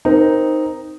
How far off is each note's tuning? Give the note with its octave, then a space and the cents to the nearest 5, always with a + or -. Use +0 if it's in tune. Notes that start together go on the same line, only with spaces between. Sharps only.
C4 +0 D#4 +0 A#4 +10